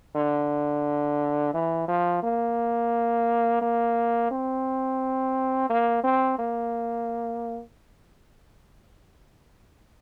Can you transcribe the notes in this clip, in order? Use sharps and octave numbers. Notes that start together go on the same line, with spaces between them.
D3
E3
F3
A#3
A#3
C4
A#3
C4
A#3